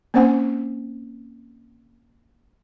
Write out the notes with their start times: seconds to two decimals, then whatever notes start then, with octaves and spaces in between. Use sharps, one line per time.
0.14 A#3 C4 C#4 C5 F#5 G#5